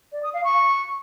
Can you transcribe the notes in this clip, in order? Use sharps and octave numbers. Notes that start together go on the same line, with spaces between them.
D5
D#6
F5
C#6